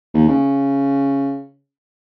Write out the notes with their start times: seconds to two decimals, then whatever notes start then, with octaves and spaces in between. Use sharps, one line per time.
0.14 D#2
0.28 C#3